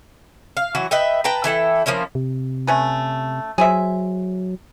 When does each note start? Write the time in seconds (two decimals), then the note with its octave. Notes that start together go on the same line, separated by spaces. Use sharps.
0.57 F5
0.75 E3 F#3 F#4
0.91 B4 D#5 E5 G5
1.24 B4 G5 A5 A#5
1.44 E3 E4 A4 G5
1.86 F3 A#3 C#4 E4
2.15 C3
2.67 A3 C#4 B4
3.58 F#3 G#4 C5 E5